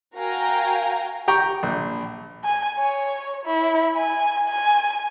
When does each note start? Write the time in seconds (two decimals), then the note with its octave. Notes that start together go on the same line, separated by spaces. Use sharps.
0.16 F#4 A#4 F5 G5 G#5 A#5
1.28 G4 G5 A#5 C#6
1.63 A#1
2.44 G#5
2.79 C#5
3.46 E4
3.97 G#5
4.48 G#5